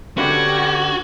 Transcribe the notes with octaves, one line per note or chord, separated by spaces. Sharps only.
D3 C#4 D4 F#4 G4 B4 C#6 G#6